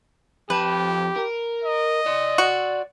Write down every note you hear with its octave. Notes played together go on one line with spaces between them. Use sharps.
F2 G4 B4 A5
A#4
D#5
D5 C6
F#4